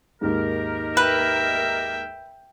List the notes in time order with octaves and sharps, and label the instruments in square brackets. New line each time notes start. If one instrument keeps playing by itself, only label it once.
[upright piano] D#2 G#2 [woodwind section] D#4 G4 A#4
[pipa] B4 [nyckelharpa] E5 G5